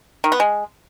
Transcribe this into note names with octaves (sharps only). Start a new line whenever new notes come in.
D#3
B3
G#3